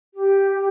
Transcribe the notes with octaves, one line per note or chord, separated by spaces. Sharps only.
G4